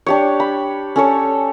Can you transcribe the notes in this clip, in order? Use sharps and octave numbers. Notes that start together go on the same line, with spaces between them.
D4 G4 C#5
B5
C#4 A4 C#5